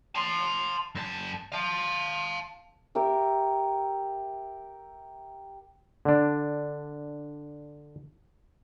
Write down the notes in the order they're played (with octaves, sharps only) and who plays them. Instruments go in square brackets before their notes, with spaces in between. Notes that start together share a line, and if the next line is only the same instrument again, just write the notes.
[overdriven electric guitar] A5 C6
F#2 A5
F5 A5
[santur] G4 A#4 E5
[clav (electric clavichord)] D3 D4